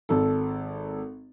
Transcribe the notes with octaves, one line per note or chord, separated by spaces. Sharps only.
G#1 A4